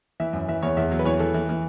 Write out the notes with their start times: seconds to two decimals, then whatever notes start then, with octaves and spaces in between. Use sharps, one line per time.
0.20 E3 E5
0.33 F#2
0.48 E3 E5
0.63 E2 C#5
0.77 E2 E5
0.91 F#3
0.99 B4
1.05 E3 C#5
1.19 E3 A4
1.34 E3
1.49 E3